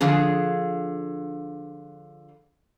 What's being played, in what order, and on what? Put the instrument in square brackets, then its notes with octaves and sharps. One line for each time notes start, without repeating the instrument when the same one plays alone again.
[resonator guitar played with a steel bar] D3 F3 D4 G#4